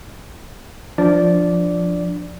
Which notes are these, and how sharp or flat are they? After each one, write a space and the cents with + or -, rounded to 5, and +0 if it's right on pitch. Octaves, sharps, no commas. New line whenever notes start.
F3 +0 D4 +0 D5 -10